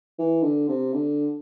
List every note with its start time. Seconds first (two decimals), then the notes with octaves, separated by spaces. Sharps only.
0.19 E3
0.43 D3
0.69 C3
0.93 D3